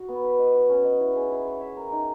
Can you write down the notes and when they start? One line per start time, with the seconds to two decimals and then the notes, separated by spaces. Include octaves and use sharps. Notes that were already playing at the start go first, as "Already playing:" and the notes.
Already playing: F#4
0.09 B3
0.24 B4
0.39 D#5
0.55 F#4
0.69 C#4
0.84 D#5
1.00 E4
1.16 G#4
1.30 E4
1.47 C#5
1.61 E5
1.77 A#4
1.92 D#4